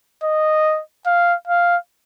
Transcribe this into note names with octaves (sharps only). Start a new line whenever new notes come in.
D#5
F5
F5